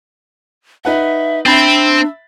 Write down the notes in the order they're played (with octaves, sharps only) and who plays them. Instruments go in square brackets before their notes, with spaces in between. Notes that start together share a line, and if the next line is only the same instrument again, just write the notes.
[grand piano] D#4 B4 F#5 [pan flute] E5
[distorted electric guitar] C4 [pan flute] D4 [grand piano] E5 B5 A6